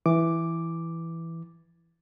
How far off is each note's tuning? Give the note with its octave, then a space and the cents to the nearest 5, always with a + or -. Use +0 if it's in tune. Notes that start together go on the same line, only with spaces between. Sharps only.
E3 +0 D6 +0